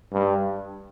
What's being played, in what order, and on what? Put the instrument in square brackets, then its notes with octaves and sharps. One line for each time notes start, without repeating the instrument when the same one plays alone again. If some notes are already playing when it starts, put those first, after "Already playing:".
[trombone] G2